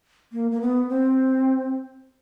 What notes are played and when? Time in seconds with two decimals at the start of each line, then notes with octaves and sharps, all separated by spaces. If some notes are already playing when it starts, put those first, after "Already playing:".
0.33 A#3
0.51 A#3
0.61 B3
0.89 C4